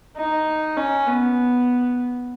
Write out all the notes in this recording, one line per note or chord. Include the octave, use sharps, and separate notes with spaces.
D#4
C#4
B3